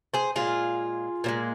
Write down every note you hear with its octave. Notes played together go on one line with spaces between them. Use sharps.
G#4 C5
A#2 F3 G#3 F4 G#4
A#2 F3 G#3